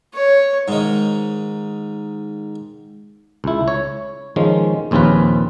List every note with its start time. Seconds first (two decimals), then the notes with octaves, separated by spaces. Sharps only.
0.14 C#5
0.68 G#2 D#3
3.44 C#2 E4
3.68 C#5
4.36 D#3 F3 G#3 C#4
4.91 A#1 D#2 C4 C#4 F4 B4